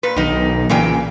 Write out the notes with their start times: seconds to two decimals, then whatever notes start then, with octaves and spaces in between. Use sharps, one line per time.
0.03 A#2 B4
0.16 B1 D#3 D#4
0.69 A#2 C#3 E3 G5